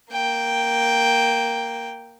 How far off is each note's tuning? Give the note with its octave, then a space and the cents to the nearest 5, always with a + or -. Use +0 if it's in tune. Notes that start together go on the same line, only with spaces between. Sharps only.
A#3 +0 G5 +0